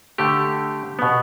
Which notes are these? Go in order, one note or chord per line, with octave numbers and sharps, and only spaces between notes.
D3 A3 G4
B2 B3